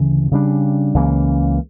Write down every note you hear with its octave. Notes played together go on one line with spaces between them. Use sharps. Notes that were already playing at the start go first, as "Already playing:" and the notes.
Already playing: D2 C#3 E3
C#3 G3 D4
C#2 C#3 E3 A#3